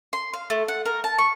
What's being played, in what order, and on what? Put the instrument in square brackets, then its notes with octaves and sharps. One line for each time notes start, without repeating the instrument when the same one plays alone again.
[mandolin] C6
F5
A3
F#5
A#4
A5
C#6